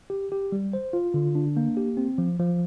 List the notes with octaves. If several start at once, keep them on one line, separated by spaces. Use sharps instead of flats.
G4
G4
G3
C5
F4
D3
D4
A#3
G4
C4
F3
F3